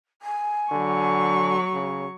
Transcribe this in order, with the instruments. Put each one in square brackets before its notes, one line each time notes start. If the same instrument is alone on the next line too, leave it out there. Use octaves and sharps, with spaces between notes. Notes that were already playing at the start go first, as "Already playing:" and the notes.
[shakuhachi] G#5
[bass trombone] D3 [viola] F#3 C#6
[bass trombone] C#3